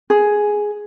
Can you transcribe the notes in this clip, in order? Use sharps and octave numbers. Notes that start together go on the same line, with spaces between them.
G#4